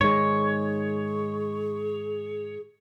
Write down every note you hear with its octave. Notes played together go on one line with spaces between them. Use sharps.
G#2 D#3 G#3 G#4 C#5